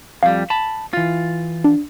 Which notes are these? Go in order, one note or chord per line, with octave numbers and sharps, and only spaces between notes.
F2 G3 F5
A5 B5
E3 F4
D4